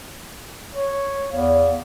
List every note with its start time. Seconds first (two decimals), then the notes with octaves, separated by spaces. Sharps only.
0.75 C#5
1.33 E2 F5